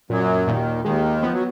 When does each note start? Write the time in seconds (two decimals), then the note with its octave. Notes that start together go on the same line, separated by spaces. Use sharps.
0.10 F#2 A#2 F#3
0.48 D#2 A#2 D#3
0.85 D#2 D#3 G#3
1.22 F3 B3
1.33 F#3